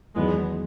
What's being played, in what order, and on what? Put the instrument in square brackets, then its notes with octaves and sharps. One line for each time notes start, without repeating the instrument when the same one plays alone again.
[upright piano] E2 D#3 F#3 [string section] G#3 B3